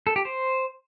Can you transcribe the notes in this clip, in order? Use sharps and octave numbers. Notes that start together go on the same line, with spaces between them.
A4
G4
C5